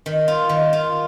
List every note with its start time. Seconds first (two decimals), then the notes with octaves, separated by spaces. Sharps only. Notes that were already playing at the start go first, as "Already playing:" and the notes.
0.06 D#3
0.28 F4
0.49 D#3
0.73 F4